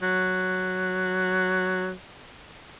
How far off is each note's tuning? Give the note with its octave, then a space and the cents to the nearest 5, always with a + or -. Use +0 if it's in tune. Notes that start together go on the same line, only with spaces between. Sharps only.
F#3 +0